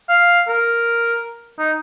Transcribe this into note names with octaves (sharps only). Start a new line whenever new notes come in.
F5
A#4
D#4